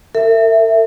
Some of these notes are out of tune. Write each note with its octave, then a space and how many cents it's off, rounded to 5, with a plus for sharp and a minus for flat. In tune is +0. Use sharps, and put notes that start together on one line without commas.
A#4 -45 E5 +0